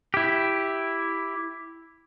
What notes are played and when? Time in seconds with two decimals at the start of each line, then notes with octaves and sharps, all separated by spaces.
0.14 E4 G4